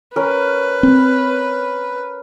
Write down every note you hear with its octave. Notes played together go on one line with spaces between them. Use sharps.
C#4 A#4 B4
C4